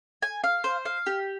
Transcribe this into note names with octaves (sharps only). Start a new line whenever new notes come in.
G#5
F5
C5
F5
G4